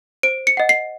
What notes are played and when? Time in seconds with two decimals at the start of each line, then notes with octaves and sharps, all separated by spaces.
0.23 C5 D7
0.47 C#7
0.57 D#5 F#5
0.69 C7